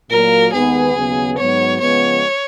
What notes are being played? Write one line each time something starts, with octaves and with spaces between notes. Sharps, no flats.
A#2 F#3 A#3 A#4
D#2 D#3 G#3 B3 G#4
D#2 C#3 F#3 B3
G#2 F#3 B3 C#5
C#3 F3 G#3 B3 C#5